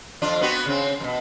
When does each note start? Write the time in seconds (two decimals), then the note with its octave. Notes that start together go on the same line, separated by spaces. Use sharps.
0.22 F2 D4 F4
0.41 B3 C4 F#4
0.66 C#3 C4
1.00 F#2 B2